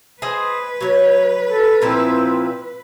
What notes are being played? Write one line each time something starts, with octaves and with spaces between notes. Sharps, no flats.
G#4 B4 C5 D#5
F#3 C#5
A4
A#2 F3 C4 E4